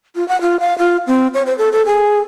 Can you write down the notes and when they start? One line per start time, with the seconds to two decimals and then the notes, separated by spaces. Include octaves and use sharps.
0.16 F4
0.28 F#5
0.41 F4
0.60 F5
0.78 F4
1.07 C4
1.34 C#5
1.46 C5
1.58 A4
1.72 A4
1.86 G#4